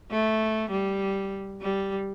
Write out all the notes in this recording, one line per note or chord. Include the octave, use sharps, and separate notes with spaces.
A3
G3
G3